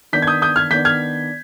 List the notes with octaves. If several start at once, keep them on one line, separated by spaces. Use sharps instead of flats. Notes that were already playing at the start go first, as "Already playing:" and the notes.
D#3 B3 D4 G6 B6
G#6
D#6 G6
D#6 G6
F6 G#6
D#3 B3 D4 G6 B6
F6 G#6